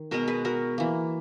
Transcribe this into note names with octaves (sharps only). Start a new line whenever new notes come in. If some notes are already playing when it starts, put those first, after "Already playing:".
Already playing: D#3
B2 G#3 B3 F#4 A#4
G#4 B4
F#4 A#4
E3 A#3